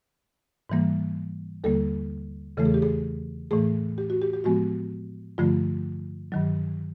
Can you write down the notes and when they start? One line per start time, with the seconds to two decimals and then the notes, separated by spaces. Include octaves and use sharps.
0.70 G#2 E3 G3 A#3
1.64 D#2 D3 G3 A#3 A4
2.57 E2 C#3 E3 A3 A4
2.66 G#4
2.74 G4
2.82 G#4
3.51 A2 E3 A3 G#4
3.98 G4
4.10 F#4
4.22 G4
4.33 G4
4.44 A2 F3 G#3 B3 F#4
5.38 G2 D3 F3 A3 F4
6.32 G2 D#3 F#3